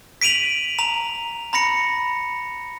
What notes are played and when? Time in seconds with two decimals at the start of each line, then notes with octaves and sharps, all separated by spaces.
0.21 B6 D7 D#7 F7 F#7
0.79 A#5 F7
1.53 A#5 B5 A#6 C#7